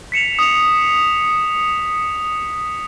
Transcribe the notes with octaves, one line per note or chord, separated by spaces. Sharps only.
B6 C#7 E7 F7
D#6 F7